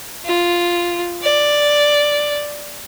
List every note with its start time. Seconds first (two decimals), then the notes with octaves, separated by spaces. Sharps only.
0.25 F4
1.22 D5